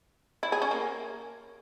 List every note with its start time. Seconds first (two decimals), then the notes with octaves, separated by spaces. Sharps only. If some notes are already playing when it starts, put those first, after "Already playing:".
0.43 E4
0.52 G#4
0.62 C#4
0.71 A#3